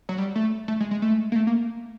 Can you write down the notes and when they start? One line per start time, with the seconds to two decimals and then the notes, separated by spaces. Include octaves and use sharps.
0.09 F#3
0.18 G3
0.35 A3
0.68 A3
0.80 G#3
0.91 G#3
1.02 A3
1.32 A#3
1.36 A3
1.47 A#3